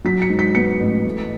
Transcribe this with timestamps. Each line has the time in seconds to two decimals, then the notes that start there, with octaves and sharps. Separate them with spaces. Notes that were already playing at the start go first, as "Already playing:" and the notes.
0.04 F#3 B6
0.22 C#7
0.30 G#2
0.39 B6
0.55 B3 C#7
0.80 A1
1.05 A3